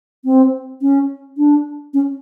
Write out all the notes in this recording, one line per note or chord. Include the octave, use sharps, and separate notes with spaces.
C4
C#4
D4
C#4